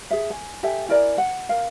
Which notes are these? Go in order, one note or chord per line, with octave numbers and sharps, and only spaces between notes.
G#4 E5
G#5
G4 A4 E5 G#5
E4 A#4 D5 G#5
F#5
A#4 F5